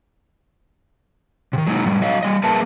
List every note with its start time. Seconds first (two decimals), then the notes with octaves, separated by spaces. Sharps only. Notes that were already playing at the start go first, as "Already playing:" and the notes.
1.53 C3 D#3
1.67 F#3 G#3 A#3 D#4
1.86 A2 G3
2.02 F#3 D#5 F5
2.23 G3 D#5
2.44 A#3 G#4 A#4 B4 E5 A5